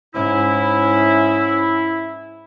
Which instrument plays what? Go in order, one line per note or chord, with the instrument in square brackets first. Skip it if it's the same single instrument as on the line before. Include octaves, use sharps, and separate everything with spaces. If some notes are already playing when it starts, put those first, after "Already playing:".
[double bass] G#2 C#4 [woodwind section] E4